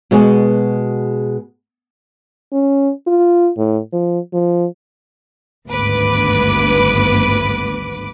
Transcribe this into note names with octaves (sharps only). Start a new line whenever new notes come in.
B2 G#3 B3 F#4 G#4
C#4
F4
A2
F3
F3
G#1 D2 G2 B3 B4 D6